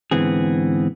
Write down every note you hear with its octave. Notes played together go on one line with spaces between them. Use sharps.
G#2 D3 E3 B3 C4 G#4